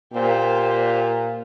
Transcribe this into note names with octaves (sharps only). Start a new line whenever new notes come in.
A#2 G4 C5